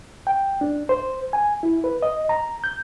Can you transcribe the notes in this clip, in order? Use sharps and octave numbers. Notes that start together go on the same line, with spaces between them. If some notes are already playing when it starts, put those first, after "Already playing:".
G5
D4
C5
G#5
E4
B4
D#5
A#5
G6